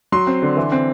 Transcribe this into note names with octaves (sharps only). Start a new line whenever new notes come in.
F#3 C6
C4
D3
E3
C4